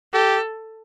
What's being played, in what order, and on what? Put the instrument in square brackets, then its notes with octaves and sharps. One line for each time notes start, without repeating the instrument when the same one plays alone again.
[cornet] G4 [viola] A4